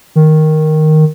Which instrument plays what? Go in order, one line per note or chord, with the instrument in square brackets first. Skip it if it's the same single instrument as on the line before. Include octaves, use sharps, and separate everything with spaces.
[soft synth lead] D#3